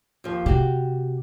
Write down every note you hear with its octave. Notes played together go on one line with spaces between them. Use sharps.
D#2 F3
C3 F#4 G4